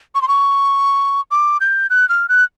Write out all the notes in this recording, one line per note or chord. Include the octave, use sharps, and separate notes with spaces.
C#6
C6
C#6
D6
G6
F#6
F6
F#6